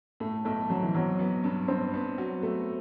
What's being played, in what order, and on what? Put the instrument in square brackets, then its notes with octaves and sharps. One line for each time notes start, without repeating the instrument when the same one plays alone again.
[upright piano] A2 [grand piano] A3
[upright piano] B1 [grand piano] A3
[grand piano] F#3 [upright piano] C4
[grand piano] E3
[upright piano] B1 [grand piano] F#3
[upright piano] B3
G2
[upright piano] G2 [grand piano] C4
[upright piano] B3
F#3
A3